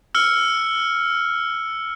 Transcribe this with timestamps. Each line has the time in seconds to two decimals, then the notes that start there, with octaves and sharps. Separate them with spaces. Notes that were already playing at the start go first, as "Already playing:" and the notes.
0.15 E6 F6 C#7 G7